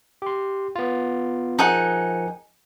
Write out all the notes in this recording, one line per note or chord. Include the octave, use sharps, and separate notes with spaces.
G4 C6
B3 F4
F3 D#4 G#4 A#4 F#5 C#7